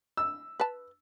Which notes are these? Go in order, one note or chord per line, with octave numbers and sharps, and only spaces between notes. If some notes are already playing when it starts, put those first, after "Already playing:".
E6
B4 A5